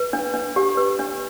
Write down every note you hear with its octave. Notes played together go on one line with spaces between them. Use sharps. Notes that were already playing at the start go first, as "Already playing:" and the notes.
Already playing: B4
D4
D4
G4
B4
D4